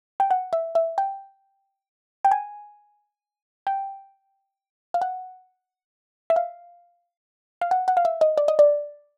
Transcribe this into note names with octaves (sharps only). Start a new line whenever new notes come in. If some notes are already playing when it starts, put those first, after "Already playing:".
G5
F#5
E5
E5
G5
G5
G#5
G5
F5
F#5
E5
F5
F5
F#5
F#5
F5
E5
D#5
D5
D#5
D5